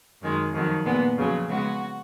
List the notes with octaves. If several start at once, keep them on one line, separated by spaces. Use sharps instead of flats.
F#2 D#3 G#3
F2 D#3 F#3
A#2 G#3 B3
F2 C#3 F#3 C#4
C#3 G#3 B3 F#4